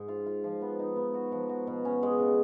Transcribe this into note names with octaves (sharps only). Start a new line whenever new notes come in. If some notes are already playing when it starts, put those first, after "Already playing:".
Already playing: G#2
F4
F4
F3
B3
D#4
B3
F#4
F3
F#4
B2
C#4
G#3
C#3